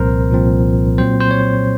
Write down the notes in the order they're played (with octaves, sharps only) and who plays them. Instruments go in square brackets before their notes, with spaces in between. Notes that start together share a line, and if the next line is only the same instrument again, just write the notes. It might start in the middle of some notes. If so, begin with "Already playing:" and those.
Already playing: [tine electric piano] C2 A#2 F3 C4 A#4 C5
C2 A#2 F3 C4
A#2 F#3 C4 C5
C5
C#5